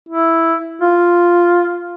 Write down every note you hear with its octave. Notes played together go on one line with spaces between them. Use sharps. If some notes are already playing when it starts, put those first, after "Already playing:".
E4
F4